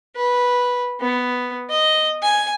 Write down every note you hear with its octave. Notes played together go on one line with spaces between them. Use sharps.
B4
B3
D#5
G#5